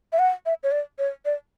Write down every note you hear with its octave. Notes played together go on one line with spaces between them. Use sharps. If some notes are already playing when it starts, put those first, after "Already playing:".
E5
F#5
E5
C#5
D5
C#5
D5